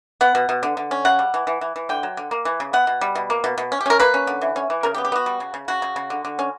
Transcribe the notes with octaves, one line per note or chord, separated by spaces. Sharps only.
B3 F#5
B2
B2
D3
D3
C#4
C#3 F#5
G3
E3
E3
E3
E3
D3 G5
F#3
D3
A#3
E3
C#3
B3 F#5
B2
G3
B2
A#3
B2
B2
C#4
G4
C#4 A#4
A#3 B4
C#4
D3
E3
C#4
E3
C#3 A#4
G4
B3
G4
B3 F#4
G3
C#3
C#3
C#3 F#4
C#3
C#3
D3
D3
C#4